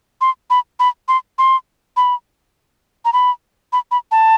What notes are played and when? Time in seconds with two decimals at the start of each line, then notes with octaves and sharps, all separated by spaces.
0.21 C6
0.50 B5
0.80 B5
1.08 C6
1.38 C6
1.97 B5
3.05 A#5
3.13 B5
3.73 B5
3.91 B5
4.12 A5